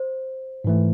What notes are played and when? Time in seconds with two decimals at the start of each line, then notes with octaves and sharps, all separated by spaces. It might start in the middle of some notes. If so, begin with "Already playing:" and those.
Already playing: C5
0.64 G#2 E3 A3